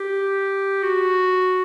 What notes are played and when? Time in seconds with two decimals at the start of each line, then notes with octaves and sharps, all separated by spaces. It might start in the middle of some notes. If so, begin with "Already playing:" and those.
Already playing: G4
0.83 F#4